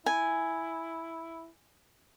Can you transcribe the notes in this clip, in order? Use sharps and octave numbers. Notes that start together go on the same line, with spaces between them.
E4 G#5